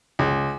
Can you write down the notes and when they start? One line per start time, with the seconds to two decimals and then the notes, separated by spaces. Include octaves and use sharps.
0.19 C#2